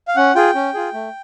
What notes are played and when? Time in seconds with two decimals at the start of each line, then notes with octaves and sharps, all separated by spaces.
0.08 F5
0.16 C#4 F#5
0.35 F4 G#4 G5
0.55 C#4
0.74 F4 G#4
0.94 A3